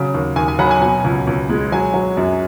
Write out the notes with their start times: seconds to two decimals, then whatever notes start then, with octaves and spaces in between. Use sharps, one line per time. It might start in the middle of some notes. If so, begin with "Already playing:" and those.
Already playing: C#3 F#3
0.14 D#2
0.36 D#2 G#5
0.48 G#5
0.59 F#3 F#5 B5
0.71 G#5
0.81 B2 G#5
1.04 C#2
1.27 C#2
1.49 G#3
1.72 F#3 G#5
1.94 F#3
2.17 F#2